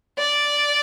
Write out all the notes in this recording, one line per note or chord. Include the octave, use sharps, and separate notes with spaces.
D5